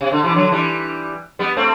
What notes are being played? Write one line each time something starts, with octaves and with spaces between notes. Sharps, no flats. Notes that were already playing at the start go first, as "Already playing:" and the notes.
C3
D3
C3 E3
D3 F#3
E3 G3
G3 B3
A3 C4